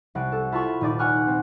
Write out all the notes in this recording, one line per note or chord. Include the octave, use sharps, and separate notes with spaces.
C2 F#5 D7
A4
E4 F4 A5 B5 C#6
D#1 D#4 D5
F#5 G#5 C#6 F6 F#6
C4